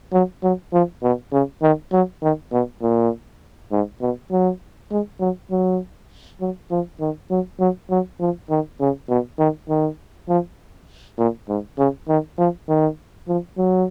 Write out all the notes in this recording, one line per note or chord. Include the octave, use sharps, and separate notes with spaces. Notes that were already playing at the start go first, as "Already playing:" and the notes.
F#3
F#3
F3
B2
C#3
D#3
F#3
D#3
B2
A#2
G#2
B2
F#3
G#3
F#3
F#3
F#3
F3
D#3
F#3
F#3
F#3
F3
D#3
C#3
B2
D#3
D#3
F3
A#2
G#2
C#3
D#3
F3
D#3
F3
F#3